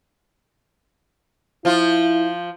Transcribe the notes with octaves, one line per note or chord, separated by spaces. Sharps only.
F3 E4 F4